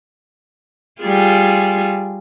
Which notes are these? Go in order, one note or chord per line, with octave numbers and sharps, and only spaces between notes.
G3 F4 G#4